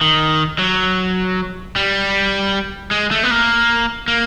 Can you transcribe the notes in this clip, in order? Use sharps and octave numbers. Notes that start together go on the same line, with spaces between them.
D#3
F#3
G3
G#3
A3
B3
A#3
A#3